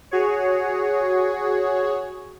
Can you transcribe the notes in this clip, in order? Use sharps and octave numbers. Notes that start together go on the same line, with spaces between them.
F#4 G#4 C#5